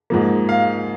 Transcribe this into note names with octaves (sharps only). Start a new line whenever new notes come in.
G#2 F3 A#3
F5